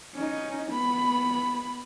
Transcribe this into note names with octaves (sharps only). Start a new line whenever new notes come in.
C#4 D#4
B3 B5